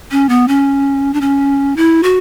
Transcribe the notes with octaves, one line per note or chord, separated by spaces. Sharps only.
C#4
B3
C#4
D4
C#4
E4
F#4